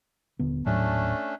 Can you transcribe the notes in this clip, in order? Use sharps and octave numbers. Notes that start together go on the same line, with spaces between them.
D#1 D3 B3
D#1 A2 F#3 A3 C#4 D4